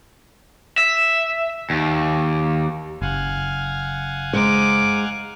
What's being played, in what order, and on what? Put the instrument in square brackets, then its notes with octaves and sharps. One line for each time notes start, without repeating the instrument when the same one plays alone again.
[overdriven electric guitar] E5
D#2
[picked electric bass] F#1 [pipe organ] F5 F#5 G#5
[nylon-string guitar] G#3 C5 [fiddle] D#4 D6